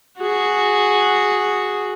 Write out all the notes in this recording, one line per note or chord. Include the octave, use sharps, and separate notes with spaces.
F#4 G#4